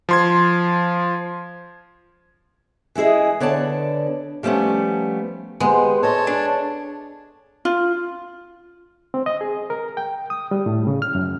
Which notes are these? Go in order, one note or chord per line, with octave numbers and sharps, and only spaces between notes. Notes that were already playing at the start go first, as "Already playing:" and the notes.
F3 C6 G#6
E3 G#3 E4 G#4 D#5
D3 B3 C#5 D5 A5
F3 G3 A3 B3 C#4
G#3 B3 G4 C5
A4 C#5 D#5 A5
D4 G#5
F4
C4
D#5
G#4
A#4
G5
D#6
G3
A2
C#3
F6
F#2